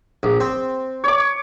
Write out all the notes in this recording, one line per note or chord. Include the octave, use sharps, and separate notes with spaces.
A#1
C4
C#5 D6